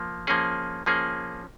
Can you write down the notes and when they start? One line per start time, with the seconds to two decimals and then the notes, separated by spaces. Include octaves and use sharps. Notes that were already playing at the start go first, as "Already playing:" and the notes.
Already playing: F3 A#3
0.27 F3 A#3 C#4 G#4
0.86 F3 A#3 C#4 G#4